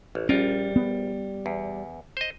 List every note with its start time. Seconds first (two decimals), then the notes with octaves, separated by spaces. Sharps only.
0.15 A1
0.29 A#1 G3 C#4 F4 A#4
0.76 B3
1.46 E2
2.17 C5 D#5